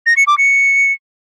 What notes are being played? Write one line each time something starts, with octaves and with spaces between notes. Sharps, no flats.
A#6
C#7
D6
C#7